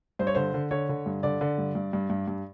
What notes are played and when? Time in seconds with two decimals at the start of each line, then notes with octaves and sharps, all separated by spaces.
0.19 G2 C5
0.27 C#5
0.35 D3 C5
0.54 D3
0.71 D3 C#5
0.89 D3
1.06 G2
1.23 D3 D5
1.41 D3
1.58 G2
1.75 G2
1.93 G2
2.10 G2
2.28 G2